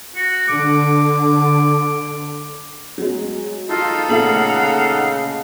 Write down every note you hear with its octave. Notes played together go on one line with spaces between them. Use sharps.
F#4
D3 D6
F#3 G#3
D#4 F4 A4
A#2 C#3 A3 F5 F#5 F#7